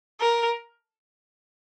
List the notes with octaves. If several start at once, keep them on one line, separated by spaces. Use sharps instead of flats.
A#4